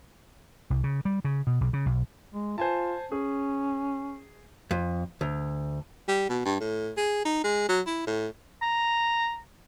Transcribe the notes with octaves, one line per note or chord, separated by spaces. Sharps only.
C2
C#3
G3
C#3
B2
B1
C#3
B1
G#3
F4 C5 G#5 A5
C#4 G#4
F2
D2
G3
B2
G2
A2
G#4
D#4
G#3
F#3
E4
A2
A#5